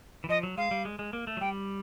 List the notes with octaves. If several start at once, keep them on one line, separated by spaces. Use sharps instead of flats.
E3
F3 D#5
F#3
G#3 F5
G3
G#3
G#3
A#3
A3
F#3
G3 G5